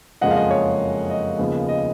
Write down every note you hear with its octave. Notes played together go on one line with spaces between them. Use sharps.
F#1 F2 C#3 F3 G#3 D#5 F#5
F5
D#5
C#5
D#5
D#2 C#3 F3 B3
D#5